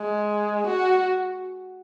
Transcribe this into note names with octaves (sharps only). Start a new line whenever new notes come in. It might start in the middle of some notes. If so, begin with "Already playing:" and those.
Already playing: G#3
F#4